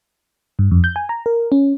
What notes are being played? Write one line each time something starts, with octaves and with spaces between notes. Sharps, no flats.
G2
F2
G6
G#5
A#5
A#4
C#4